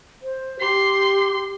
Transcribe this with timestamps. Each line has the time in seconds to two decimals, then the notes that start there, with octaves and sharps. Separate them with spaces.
0.22 C5
0.60 G4 C6